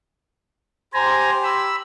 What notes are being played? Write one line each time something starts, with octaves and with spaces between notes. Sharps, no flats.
G4 C5 G#5 A#5 C6
B5 E6